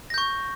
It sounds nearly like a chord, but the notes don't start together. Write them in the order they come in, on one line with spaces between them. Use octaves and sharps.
A#6 G6 C#6